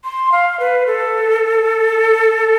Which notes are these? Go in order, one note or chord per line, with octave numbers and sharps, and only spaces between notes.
C6
F5
B4
A4